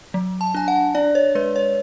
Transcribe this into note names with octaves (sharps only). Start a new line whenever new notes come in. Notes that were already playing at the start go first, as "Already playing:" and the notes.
F#3
A5
D4 G#5
F#5
D4 D5
C#5
G#3 B4
C#5